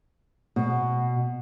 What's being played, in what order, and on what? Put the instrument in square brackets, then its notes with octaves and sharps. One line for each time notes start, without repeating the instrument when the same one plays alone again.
[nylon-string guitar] B2